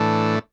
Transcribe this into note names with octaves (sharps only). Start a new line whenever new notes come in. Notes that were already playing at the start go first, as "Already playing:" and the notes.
Already playing: A2 E3 A3 D4